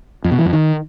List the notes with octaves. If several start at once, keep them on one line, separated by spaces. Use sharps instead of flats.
F2
B2
E3
F2
D#3